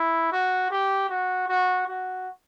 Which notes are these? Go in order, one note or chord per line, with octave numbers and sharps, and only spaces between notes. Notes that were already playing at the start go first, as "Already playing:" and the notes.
Already playing: E4
F#4
G4
F#4
F#4
F#4